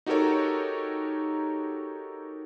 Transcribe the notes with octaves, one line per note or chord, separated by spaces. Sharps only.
D#4 F#4 G4 A4 A#4 C#5